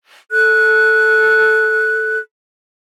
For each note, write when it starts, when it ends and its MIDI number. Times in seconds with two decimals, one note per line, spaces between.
0.32 2.17 69
0.32 2.17 90